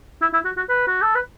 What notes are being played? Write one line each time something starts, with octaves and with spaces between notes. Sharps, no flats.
E4
E4
F#4
F#4
B4
F#4
A4
B4